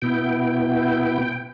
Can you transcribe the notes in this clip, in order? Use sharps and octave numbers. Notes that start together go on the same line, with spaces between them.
B2 B3 E4 G5